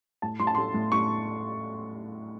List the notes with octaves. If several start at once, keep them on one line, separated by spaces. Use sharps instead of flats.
A2 A5
A2 C6
A5
A3 C6
A2
A2 C#6